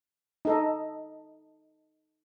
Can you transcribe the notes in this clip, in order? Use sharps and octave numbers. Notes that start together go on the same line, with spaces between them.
D#4 A4 D#5